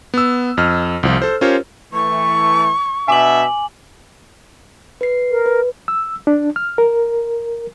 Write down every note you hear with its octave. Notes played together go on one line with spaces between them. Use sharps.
B3 E6
F2 D#5 F6
C2 F3 F4
A4 C5
C#4 F4 G4 A#4 C5 C#5
E3 A3 C#6
B2 D4 E5 G#5 D6 F#7
B4 C7
A#4
B4
E6
D4
F6
A#4